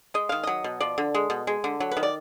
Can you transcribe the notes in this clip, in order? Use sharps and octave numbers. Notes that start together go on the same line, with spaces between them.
G#3 D#5
D#3 F5
F#3 D#5
B2
F3 D5
D3
G#3
B2
G#3
D3
F#3
B4
D#3
D5